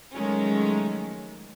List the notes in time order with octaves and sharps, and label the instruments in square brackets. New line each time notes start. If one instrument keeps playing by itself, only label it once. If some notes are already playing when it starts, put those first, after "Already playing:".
[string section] D#3 F3 F#3 G#3 A3 C#4